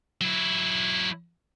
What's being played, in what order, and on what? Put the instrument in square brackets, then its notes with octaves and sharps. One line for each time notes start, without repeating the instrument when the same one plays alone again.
[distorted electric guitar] F#3 E4